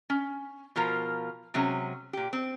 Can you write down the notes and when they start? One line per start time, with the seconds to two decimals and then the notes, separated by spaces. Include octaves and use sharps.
0.10 C#4
0.76 B2 F3 F4 A#4 A#5
1.54 C3 F#3 G#3 C#4
2.13 A#2 G4
2.33 C4